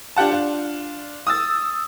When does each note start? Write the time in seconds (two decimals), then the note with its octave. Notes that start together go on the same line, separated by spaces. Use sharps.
0.17 D4 F4 G4 F#5 A5
0.31 D4 F4
1.27 D#6 E6 A6